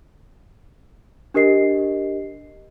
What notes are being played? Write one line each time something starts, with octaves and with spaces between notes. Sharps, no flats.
D4 G4 A#4 D#5 C7